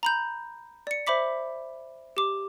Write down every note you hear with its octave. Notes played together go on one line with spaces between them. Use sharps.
A#5 B5 G6
D5 C#7
C5 E5 B5 D6 B6
G4 D6